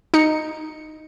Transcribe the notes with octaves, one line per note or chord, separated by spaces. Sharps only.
D#4 C#7